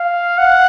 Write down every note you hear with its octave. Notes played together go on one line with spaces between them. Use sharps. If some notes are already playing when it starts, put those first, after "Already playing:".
Already playing: F5
F#5